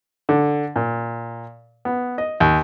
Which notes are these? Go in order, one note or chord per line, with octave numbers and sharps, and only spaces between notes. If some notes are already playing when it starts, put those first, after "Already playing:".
D3
A#2
B3
D#5
D#2